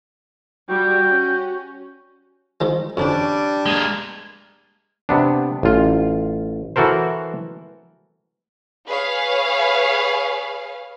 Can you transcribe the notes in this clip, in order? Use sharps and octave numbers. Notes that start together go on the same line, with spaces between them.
G3 F#4 G5
C#4
D#3 F3 G#3
F2 D3 G3 C#4 D4
G#3 A#3
C3 B3 D4
A1 F4
E3 F#4 A4 A#4 C5
G#4 B4 C#5 F5